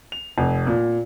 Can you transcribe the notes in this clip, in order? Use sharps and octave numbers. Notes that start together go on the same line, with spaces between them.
F7
F1
A#2